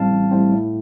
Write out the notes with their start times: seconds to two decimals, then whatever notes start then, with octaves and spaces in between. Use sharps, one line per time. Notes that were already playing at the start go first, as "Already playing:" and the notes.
Already playing: A1 A2 G3 C4 F5 A5
0.10 A1
0.31 A2 G3 C4
0.51 A2